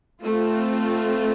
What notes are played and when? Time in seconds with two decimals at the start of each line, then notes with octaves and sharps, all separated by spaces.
0.22 A3 C4 F4